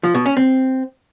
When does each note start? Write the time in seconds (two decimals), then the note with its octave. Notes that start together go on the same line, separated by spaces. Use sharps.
0.03 F3
0.15 B2
0.26 C#4
0.37 C4